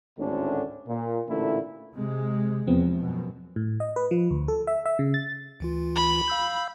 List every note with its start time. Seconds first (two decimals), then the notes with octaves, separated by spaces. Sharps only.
0.18 G#1 D2 A2 D3 C#4 D4
0.87 A#2
1.28 A1 A#2 D3 A3 E4
1.94 C3 G#3
2.67 E2 F3 B3 C4
2.99 F#2 B2
3.56 A2
3.80 D#5
3.96 B4
4.11 F3
4.31 D2
4.48 A4
4.67 E5
4.86 E5
4.99 C#3
5.14 A6
5.60 D2 E3 F4
5.96 B5
6.28 F5 E6 G6